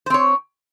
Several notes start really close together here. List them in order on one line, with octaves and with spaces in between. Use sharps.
C5 C4 C#5